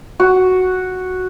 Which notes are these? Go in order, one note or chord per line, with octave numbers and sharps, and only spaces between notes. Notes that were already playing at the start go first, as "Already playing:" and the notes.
F#4